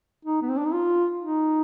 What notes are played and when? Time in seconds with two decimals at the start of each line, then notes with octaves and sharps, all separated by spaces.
0.25 D#4
0.42 B3
0.50 C4
0.57 D4
0.65 D#4
0.72 F4
1.20 D#4